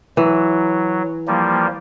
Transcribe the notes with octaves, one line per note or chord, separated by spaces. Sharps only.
E3 F#3
F3 G3 A#3